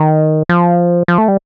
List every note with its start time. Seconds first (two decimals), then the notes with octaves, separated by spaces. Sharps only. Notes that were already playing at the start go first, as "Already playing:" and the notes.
Already playing: D#3
0.49 F3
1.08 F3
1.18 A3
1.28 G3